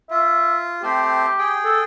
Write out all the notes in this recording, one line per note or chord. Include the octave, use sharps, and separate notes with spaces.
F4 E5
A3 C4 G4 C5
G#4 G5
A4